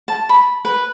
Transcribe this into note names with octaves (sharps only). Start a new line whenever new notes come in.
A5
B5
B4